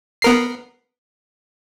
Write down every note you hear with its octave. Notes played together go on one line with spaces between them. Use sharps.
B3 A#4 C7